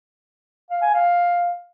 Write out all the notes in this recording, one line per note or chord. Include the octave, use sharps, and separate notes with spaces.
F5
G#5
F5